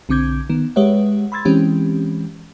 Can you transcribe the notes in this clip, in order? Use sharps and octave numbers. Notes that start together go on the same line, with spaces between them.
B1 D3 C4 D6 G6 G#6
D#3 B3
G#3 G4 B4 C#5 E5 F#5
B5 C6 E6 G#6 A6
E3 G#3 C4 C#4 G4